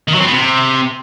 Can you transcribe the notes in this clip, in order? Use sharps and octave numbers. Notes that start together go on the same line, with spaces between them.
D#3
F#3
C4
B3
C3